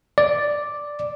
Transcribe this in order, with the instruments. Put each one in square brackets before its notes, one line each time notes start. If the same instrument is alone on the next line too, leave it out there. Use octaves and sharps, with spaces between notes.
[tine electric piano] D5